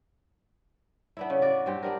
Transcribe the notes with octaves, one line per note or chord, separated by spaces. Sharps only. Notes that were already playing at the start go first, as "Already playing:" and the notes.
B3 D4 E4
C#3
F#4 D5
G2 C4 G4
B3 D4 A#4